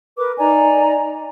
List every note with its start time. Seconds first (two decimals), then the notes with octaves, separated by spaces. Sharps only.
0.17 A#4 B4 D6
0.38 D#4 D5 G#5 A#5